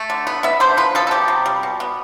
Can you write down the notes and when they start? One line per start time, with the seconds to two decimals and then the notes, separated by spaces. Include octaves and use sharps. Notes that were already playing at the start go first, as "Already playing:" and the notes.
Already playing: A3
0.10 D3
0.27 B3
0.43 B3 E5
0.60 D3 C5
0.77 F3 B4
0.95 F3 A4
1.07 A4
1.11 B3 G4
1.28 C3
1.46 G3
1.63 B2
1.80 B3